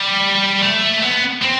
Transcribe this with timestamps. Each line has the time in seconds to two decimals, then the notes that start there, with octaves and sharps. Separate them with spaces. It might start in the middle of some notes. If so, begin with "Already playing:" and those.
Already playing: G3
0.63 A3
1.02 B3
1.42 C4